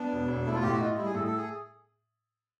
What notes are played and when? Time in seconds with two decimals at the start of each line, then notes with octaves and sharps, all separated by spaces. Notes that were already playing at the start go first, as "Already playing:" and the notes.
Already playing: B3 D4
0.12 E1
0.28 E1
0.46 A3 E4
0.55 F4
0.63 A2 G4
0.72 F#4
0.80 D#4 F4
0.97 G3 E4
1.06 G#4
1.14 A2 A4
1.27 A4
1.37 G#4